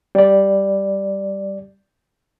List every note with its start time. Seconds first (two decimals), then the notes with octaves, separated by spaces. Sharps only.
0.15 G3 D5